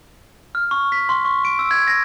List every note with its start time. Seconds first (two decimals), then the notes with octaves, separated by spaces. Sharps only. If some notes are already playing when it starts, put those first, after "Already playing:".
0.55 F6
0.71 C#6
0.92 B6
1.09 C6
1.25 C#6
1.45 D7
1.59 E6
1.71 G#6
1.87 A#6